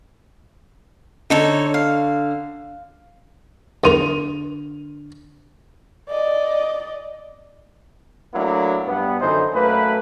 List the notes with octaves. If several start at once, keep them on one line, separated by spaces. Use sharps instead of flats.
D3 D#4 A4 C#5
F5
E2 D3 F4 A#4 D#7 F7
D5 D#5
F#3 A3 A#3 D4 E4
G2 B3
F#2 D3 E3 D#4 C5
F#2 A3 A#3 B4